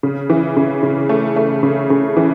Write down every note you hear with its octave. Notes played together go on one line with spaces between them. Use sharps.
C#3
E3
C#3
C#3
A3
A3
C#3
C#3
E3